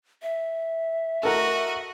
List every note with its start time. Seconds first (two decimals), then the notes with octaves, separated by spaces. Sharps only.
0.22 E5
1.23 F#4 A4 A#4 D#5 F#5